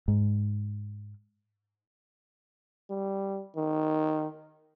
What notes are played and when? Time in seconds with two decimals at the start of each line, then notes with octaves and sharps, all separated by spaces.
0.08 G#2
2.90 G3
3.56 D#3